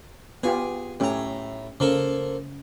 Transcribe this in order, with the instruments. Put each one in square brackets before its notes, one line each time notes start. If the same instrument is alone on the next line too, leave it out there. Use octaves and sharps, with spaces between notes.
[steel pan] B3 F4 G4 [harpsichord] G#4
[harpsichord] A2 A#5 [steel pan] A3 C#4 G4
[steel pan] C#3 [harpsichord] F3 A#3 A4